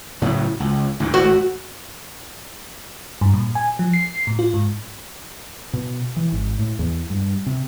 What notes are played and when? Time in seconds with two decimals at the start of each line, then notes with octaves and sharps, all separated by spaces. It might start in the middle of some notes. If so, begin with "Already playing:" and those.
0.22 A2 C#3 F#3
0.60 C#2
1.00 D2 G#2 D3
1.14 G#1 A3 F#4
3.21 G2
3.33 A#2
3.55 G#5
3.79 F3
3.93 C7
4.27 A2
4.39 F4
4.54 G#2
5.73 B2
6.16 E3
6.32 G#1
6.59 A2
6.79 E2
7.10 G2
7.46 C3